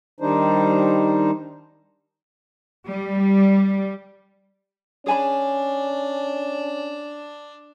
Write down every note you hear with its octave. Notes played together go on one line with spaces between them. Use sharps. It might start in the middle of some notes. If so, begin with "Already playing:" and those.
D#3 G3 D4 D#4 C5
G3
C#4 D4 G#4 G#5 B5